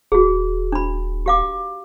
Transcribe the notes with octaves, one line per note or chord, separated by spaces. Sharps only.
D#1 F#4 G#4
D4 B5
G4 F5 D6